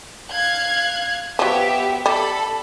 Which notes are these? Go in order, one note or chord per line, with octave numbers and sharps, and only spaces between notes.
F5 F#6 G#6
F3 F#3 B3 G4 E5
G3 A4 B5